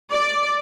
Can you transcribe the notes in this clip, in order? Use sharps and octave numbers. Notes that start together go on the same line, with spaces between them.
D5